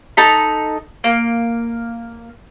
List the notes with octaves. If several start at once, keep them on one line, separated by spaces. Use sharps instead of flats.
D#4 A4 A#5 B5
A#3